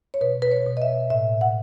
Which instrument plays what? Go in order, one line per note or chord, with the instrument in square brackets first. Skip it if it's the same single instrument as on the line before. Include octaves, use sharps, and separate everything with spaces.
[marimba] C#5
B2 B4
B4
C#5
B2
D#5
E5
A2 E5
F#5